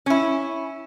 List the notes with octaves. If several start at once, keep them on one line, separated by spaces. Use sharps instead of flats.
C#4 E4